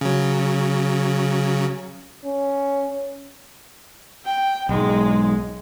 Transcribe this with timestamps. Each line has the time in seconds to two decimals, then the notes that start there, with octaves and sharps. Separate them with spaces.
0.01 C#3 F#3
2.25 C#4
4.25 G5
4.69 B1 G#2 G#3